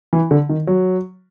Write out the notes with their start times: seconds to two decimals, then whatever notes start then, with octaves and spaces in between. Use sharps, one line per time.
0.13 E3
0.31 D3
0.49 D#3
0.67 F#3